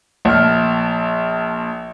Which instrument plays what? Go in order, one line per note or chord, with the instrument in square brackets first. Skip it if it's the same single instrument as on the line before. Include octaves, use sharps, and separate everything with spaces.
[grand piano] A#1 F6